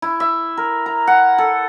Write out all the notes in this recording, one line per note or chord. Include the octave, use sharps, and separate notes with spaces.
E4
E5
A#4
A#5
F#5
A4